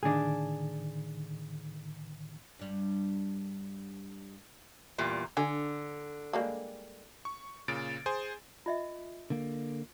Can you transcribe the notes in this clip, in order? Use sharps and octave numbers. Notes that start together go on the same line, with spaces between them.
A2 D3 D#3 D4 G#4
G2 G3
E2 A#2 G3
D3 G#5
G3 G#3 A#3
C#6
A#2 C#3 A6 D7
G#4 C5 G#5
F4 D#5 E5
D3 A#3